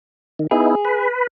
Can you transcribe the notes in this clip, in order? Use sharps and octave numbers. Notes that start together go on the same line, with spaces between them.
D#3
B3 D#4 E4 G#4
B4